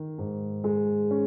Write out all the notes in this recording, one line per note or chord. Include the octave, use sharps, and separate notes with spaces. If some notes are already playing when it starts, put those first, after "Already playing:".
Already playing: D#3
G#2
G#3
C#4